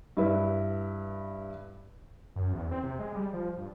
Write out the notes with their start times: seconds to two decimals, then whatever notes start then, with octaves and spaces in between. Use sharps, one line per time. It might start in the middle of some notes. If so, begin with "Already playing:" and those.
0.17 G2 E4 B4
2.36 F#2
2.53 E2
2.71 C4
2.83 C3
2.99 G#3
3.15 G3
3.33 F3
3.57 G2